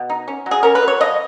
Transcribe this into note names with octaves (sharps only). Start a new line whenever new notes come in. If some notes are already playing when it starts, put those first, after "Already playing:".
Already playing: B2
D#4
C#4
F#3
G#4
C#4 A#4
B4
F#3
C#5
F3 D#5